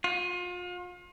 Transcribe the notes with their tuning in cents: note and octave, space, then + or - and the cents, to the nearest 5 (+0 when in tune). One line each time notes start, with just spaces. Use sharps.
F4 +35